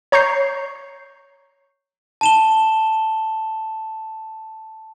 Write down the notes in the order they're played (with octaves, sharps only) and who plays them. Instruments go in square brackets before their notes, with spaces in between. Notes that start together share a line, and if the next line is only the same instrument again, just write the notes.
[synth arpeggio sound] C#5 A#5 C#6 G6 C7
[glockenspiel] A5 E7 G7